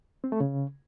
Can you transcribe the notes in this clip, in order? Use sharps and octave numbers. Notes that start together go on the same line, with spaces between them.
C4
A3
C#3